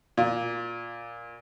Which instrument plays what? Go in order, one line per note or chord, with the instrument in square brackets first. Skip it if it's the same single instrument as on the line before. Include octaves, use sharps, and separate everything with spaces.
[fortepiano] A#2